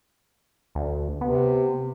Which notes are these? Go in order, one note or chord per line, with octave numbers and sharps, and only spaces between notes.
D2
C3 B3